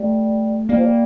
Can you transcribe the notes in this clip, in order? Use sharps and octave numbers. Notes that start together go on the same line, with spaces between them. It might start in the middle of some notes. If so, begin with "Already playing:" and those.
Already playing: G3 A3
G3 A#3
F3
G3